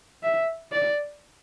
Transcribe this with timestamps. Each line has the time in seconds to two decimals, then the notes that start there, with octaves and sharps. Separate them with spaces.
0.23 E5
0.72 D5